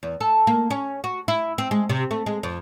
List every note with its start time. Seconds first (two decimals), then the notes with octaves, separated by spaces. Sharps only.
0.03 E2
0.21 A4
0.47 A#3
0.70 C#4
1.04 F#4
1.28 E4
1.58 C4
1.71 G#3
1.89 C3
2.11 A3
2.26 G#3
2.43 F2